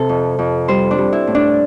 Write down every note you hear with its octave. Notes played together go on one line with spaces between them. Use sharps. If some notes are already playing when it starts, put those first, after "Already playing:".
Already playing: C3 A4
F2
F2
G3 C5
D4
G3
E4
A2
D4